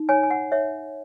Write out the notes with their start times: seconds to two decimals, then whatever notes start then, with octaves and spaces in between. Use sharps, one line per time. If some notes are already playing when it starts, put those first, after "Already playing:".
Already playing: D#4
0.09 C#5 G#5
0.23 G#5
0.31 F#5
0.52 C#5 E5